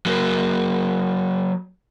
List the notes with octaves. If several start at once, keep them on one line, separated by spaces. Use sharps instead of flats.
F#3 A#3